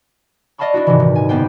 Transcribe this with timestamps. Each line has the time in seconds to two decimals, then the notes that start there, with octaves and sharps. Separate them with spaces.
0.58 D5 D#5 F5 A5 B5 C#6
0.74 D4 E4 F#4
0.87 G#2 C3 D#3 E3
1.00 D#1
1.15 G#5
1.28 F#1 A#3 B3 C5 G5 G#5